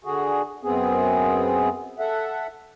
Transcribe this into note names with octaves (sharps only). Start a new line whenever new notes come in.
D3 F#4 G#4
F#2 B3 C4 G#4
A4 E5 F#5